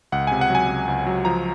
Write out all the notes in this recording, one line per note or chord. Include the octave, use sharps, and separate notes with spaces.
C#2 F#5
C3 G#5
F#5
F#3 G#5
C#2
C#2
F#3
F3 A#5